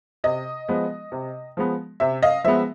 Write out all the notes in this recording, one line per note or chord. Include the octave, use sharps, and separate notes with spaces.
C3 D#5
F3 G#3 B3
C3
F3 G#3 B3
C3 E5
D#5 F5
F3 G#3 B3 E5